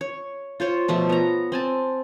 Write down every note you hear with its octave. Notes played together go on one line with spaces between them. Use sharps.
C#5
F4 C5 C#5
B2 F3 A3
B3 A#5
C4 G#5 A5